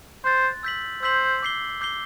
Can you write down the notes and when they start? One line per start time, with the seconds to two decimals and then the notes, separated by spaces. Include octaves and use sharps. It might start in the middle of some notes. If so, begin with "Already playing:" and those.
0.24 C5 C6 F#6 A6
0.63 E6 G6 B6 F#7
1.03 C5 E6 G6 B6 F#7
1.42 D6 G6 C7 G7
1.81 D6 G6 C7 G7